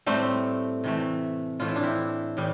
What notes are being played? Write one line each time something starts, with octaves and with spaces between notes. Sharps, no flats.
A2 G3 A3 C4
C3 E3 A3
A2 E3 A3 F4
E4
D4
C4 E4
A2 E3 G3